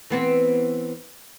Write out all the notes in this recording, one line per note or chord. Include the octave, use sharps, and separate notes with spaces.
E3 B3 C4